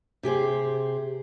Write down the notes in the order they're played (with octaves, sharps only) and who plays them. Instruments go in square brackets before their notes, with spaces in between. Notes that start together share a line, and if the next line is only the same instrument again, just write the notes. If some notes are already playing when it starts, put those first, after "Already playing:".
[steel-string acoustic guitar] C3 G4 G#4 C5